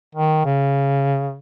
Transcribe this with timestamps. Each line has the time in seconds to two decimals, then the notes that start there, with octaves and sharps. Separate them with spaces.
0.15 D#3
0.45 C#3